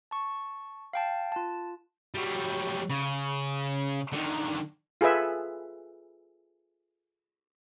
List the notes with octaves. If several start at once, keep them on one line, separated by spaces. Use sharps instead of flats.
A5 C#6
F5 G5 A5
F4 A5
F#3 G3
C#3
D3 D#3
F4 G#4 A4 B4 E5